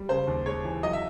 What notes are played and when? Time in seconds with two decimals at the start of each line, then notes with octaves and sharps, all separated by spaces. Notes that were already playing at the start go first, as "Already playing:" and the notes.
Already playing: G3
0.09 C#3 C5
0.27 D#2
0.46 G#3 C#5
0.65 E3
0.83 F#3 D#5
0.93 E5